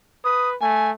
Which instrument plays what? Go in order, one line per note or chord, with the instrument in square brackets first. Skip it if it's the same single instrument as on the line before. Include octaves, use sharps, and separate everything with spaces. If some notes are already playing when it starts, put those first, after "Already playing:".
[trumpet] B4 [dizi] D#6
[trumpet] A3 [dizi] G#5